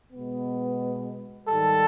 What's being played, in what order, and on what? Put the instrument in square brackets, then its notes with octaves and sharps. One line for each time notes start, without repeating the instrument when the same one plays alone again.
[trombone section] B2 G#3 B3
[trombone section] G#2 D#3 G3 [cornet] A4